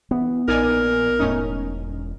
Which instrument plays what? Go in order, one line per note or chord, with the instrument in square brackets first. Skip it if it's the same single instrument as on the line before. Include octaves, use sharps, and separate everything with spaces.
[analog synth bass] E3 [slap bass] B3
[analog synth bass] A#1 [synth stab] D#4 D5 G#5 [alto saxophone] A#4
[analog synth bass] E1 [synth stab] A2 C#4 D#4